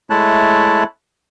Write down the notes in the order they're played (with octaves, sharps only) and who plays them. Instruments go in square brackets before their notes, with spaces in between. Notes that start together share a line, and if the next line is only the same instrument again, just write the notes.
[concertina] G#3 A3 E4 C#5 A5 F#6